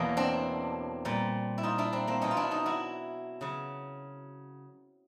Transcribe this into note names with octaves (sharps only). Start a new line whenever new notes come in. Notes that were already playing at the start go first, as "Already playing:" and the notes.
Already playing: E2 B2 F#3 A#3
C4 D4
A#2 G3
E4
D#4 F4
D4 E4
C4 D4
A#3 C4
B2 F#3 C#4 D#4
F4
D4 E4
D#4 F4
E4 F#4
C#3 F#3